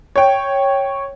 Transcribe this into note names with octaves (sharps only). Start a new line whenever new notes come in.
C#5 G5